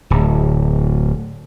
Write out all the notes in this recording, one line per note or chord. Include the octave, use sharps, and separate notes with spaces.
D1